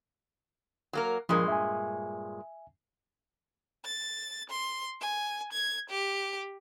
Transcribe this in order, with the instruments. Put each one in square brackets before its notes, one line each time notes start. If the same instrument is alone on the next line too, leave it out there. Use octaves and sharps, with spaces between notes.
[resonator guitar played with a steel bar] F#3 A#3 A#4
[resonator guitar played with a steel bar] G2 A#2 G#3 [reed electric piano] F3 A#4
[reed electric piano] E5 G#5
[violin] A6
C6
G#5
G#6
G4